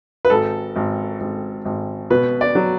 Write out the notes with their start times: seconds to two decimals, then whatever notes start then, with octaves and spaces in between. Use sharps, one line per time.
0.25 B4
0.30 G#1 A4
0.76 G#1
1.20 G#1
1.65 G#1
2.10 B2 B4
2.41 D5
2.55 F#3